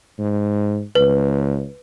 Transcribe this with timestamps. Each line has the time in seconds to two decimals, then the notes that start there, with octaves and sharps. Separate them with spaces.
0.18 G#2
0.95 C#2 B4